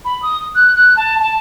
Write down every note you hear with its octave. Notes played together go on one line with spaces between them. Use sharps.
B5
D#6
F#6
F#6
A5
A5